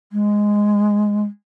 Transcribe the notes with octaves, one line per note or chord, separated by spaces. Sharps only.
G#3